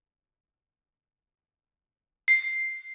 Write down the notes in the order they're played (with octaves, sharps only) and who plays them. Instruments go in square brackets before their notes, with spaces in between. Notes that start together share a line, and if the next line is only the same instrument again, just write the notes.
[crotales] C7